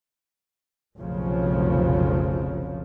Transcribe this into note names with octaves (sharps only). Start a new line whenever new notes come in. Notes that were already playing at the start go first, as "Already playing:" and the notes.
F1 B1 F2 C#3 F3 F#3